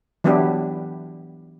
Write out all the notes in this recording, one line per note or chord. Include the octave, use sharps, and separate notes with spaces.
E3 F#3 B3 D4 E4 G4